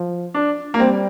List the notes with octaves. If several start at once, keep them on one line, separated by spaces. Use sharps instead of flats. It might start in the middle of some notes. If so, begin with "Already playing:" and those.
Already playing: F3
D4
A#3
G3 C4